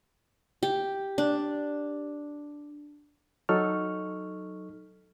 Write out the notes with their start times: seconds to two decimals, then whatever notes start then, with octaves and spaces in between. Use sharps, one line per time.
0.63 G4
1.18 D4
3.49 F#3 D#4 A4 C#6 F6